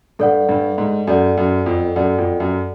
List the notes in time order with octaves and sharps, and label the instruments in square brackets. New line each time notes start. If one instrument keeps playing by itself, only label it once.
[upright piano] G2 [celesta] A4 D5 F#5
[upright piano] G2
G#2
[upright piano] F#2 [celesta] A4 D5 F#5
[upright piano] F#2
F2
[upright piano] F#2 [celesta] A4 D5 F#5
[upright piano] F2
F#2